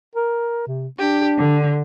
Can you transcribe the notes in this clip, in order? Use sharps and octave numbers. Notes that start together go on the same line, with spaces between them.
A#4
C3
D4 G4
D3